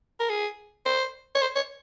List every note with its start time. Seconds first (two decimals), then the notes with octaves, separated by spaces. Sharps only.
0.20 A#4
0.29 G#4
0.85 C5
1.35 C#5
1.41 C5
1.55 C#5